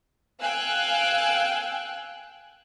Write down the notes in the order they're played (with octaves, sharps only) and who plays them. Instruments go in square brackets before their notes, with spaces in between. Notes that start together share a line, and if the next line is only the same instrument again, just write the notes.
[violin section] F5 G5 G#5 E6 F#6